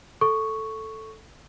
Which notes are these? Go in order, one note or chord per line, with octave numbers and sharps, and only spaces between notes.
A4 C#6